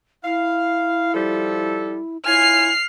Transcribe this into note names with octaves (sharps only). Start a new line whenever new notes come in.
E4 F5
F3 G3 A4
E4 F4 C#5 G#5 F6 C7